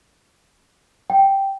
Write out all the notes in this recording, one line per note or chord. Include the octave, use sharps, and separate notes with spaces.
G5